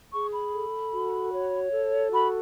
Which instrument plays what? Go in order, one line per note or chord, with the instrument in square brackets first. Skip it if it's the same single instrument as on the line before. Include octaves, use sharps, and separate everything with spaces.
[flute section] G#4 C#6
B5
A4
F#4
C#5
A4
F#4 B5